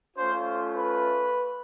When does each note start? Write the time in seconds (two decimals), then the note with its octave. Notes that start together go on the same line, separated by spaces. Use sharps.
0.17 A3 C#4 F4 C5
0.77 B4